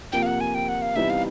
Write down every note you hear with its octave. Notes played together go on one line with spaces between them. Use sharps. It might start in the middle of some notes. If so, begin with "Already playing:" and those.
F2 C3 F3 A#3 G5
F5
F#5
G#5
G5
F#5
F5
C3 E3 G3 B3 D#4 E5
F5